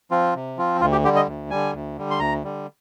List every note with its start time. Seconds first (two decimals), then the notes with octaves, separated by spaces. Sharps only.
0.11 F3 C4 F4
0.35 C3
0.57 F3 C4 F4
0.81 D2 F4
0.92 G4
1.04 D3 G4
1.08 G3
1.16 D#5
1.28 D2
1.50 D3 G3 G#5
1.74 D2
1.97 D3 G3
2.11 C6
2.20 D2 A#5
2.44 D3 G3